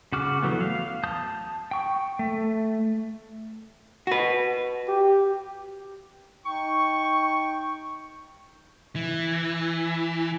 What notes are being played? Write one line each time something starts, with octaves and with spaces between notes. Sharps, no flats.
C#3 F#4 D6 F6
E3 F#3 A3 B3
F5
A5 D#6 G6
G5 C#6
A3
F#4 B4
G4
D#4 G5 C#6
E3